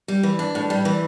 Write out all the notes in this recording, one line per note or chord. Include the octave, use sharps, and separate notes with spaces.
G3
E3
D4
A2
G3
E3